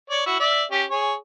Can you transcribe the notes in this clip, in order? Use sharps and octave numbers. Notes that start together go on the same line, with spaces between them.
C#5 D5
E4 F#4
D5 E5
C#4 G4
G#4 C#5